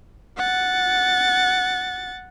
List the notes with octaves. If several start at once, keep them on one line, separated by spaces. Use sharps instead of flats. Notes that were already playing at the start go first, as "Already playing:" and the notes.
F#5 A6